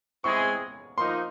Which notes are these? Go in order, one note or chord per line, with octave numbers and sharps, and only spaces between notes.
G#3 C4 E4 G#4 C#6
F3 A#3 D#4 C6